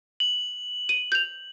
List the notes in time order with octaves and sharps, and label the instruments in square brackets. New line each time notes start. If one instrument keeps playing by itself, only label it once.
[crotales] F#7
[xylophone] D#7
G6 F7